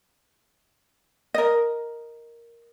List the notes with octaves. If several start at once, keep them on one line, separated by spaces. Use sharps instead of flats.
A#4 D#5